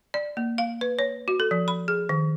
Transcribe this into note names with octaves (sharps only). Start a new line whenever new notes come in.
D5
A#3
F5
B4
C#5
F#4
A4
F3
B5
G#4
D#3